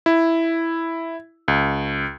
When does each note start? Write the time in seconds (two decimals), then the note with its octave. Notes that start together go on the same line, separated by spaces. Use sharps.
0.06 E4
1.48 C#2